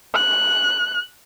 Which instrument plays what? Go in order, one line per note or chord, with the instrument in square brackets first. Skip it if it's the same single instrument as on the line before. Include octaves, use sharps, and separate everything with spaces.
[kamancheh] F#6